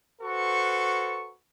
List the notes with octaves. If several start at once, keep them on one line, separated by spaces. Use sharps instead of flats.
F#4 A4 B4 C5 C#6